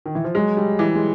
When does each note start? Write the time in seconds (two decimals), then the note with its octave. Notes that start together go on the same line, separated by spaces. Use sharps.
0.06 D#3
0.15 E3
0.24 F3
0.35 F#3 G#3
0.57 G3
0.79 E3
0.95 G#3